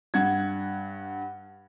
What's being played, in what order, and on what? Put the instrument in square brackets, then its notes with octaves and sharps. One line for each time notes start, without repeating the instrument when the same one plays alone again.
[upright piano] G2 F#5 G#6